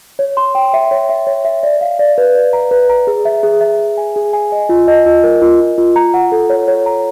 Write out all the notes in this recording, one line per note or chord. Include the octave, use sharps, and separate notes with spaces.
C#5
C6
G5
E5
C#5
E5
C#5
E5
D5
F5
D5
B4
D5
A#5
B4
A#5
G#4
E5
G#4
E5
E5
G#5
G#4
G#5
D#5
F4
D#5
F4
A#4
F4
F4
F4
A#5
F#5
A4
C#5
C#5
A#5